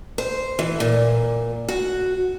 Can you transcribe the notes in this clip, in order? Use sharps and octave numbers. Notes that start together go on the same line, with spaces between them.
C5
E3
A#2
F#4